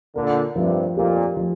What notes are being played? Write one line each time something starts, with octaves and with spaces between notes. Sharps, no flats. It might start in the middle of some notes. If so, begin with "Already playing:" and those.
A#2 D3 A#4
G2 C3 F3
F2 A#2 G4
F3